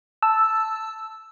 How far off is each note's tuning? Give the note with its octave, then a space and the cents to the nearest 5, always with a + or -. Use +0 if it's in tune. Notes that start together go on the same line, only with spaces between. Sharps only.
A5 +0 E6 +0